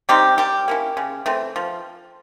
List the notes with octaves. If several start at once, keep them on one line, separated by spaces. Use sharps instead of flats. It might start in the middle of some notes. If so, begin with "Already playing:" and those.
G3 C4 D#4 G4
G3 G4
A#3 C#4 E4
C#3
E3 A3 C4
F3